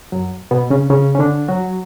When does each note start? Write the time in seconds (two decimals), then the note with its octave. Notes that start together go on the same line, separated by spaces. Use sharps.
0.12 F#2 F#3
0.51 B2 B3
0.70 C#3 C#4
0.90 C#3 C#4
1.15 C#4
1.19 D3 D4
1.48 F#3 F#4